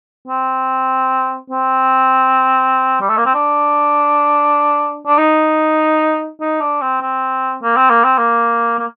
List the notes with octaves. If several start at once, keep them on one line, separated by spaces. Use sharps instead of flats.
C4
C4
G3
A3
A#3
C4
D4
D4
D#4
D#4
D4
C4
C4
A#3
C4
A#3
C4
A#3
A#3